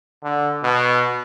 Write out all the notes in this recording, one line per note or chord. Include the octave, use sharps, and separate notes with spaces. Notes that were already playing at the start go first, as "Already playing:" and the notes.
D3
B2